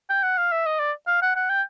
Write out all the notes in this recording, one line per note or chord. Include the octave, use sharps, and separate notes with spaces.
G5
F#5
F5
E5
D#5
D5
F5
F#5
F#5
G5